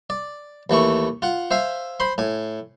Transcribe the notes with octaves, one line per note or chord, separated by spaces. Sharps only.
D5
D#2 E3 A3 C#6
F4 F#5
C5 E5 F5 G#5
C5 B5 C6
A2 G#5